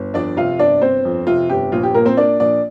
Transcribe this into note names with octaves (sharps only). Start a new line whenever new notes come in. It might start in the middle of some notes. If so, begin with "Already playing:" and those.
Already playing: G1
F2 D4 D5
C3 F4 F5
G1 D4 D5
G1 C4 C5
F2
C3 F4
G1 G4
A#1 F4
G4
A#2 A#3 A#4
C4 C5
A#3 D4 D5
A#1 D4 D5